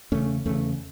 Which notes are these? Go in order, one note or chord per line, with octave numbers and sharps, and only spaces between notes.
E2 C#3 A3 C#4
E2 C#3 A3 C#4